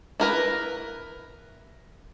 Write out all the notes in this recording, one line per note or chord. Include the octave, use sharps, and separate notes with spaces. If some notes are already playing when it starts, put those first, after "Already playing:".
E4 A#4 B4